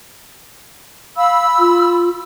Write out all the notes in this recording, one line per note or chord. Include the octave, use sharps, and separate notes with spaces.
F5 B5 E6
F4